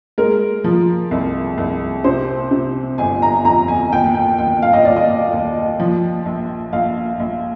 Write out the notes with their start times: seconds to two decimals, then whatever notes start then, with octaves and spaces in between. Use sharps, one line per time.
0.18 G#3 A#4
0.64 F3
1.11 C2
1.58 C2
2.04 C3 C5
2.51 C3
2.98 G1 G#5
3.22 A#5
3.45 F2 A#5
3.68 G#5
3.92 D#2 G5
4.15 G5
4.38 D#2 G5
4.62 F5
4.73 D#5
4.85 D#2 D5
4.96 D#5
5.32 D#2
5.80 F3
6.25 A#1
6.73 A#1 F5
7.20 A#1